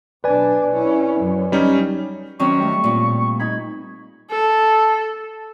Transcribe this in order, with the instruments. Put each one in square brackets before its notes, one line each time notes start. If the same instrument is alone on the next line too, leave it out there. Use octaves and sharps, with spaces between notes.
[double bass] B1 D4 [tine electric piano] B4 D5 G#5
[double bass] C#4 E4
F#2
[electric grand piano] G3 C#4 D#4
[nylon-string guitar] D#3 F#3 C#4 [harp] C4 [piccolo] C#6
[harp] G3 A3
[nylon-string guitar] A#2 A#3
[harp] D#4 B5 [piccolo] G#6
[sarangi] A4